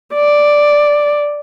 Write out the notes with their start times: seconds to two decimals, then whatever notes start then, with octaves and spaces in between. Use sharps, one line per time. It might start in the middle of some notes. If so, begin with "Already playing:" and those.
0.14 D5